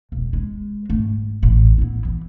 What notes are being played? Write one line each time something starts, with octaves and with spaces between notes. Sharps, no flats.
E1
G#3
G#2 A3
A1
B3 E4
E3